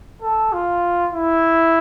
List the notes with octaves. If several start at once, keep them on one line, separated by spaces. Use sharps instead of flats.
A4
F4
E4